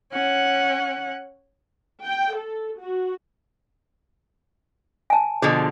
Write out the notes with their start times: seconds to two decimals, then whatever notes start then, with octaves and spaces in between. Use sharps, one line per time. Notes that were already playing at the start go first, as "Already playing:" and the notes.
0.12 C#4 F#5
2.03 G5
2.34 A4
2.78 F#4
5.10 G#5 A5
5.42 B2 D3 F3 G#4